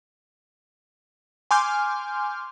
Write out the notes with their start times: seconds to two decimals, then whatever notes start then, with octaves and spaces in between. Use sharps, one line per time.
1.51 G#5 C6 D6 F6 G6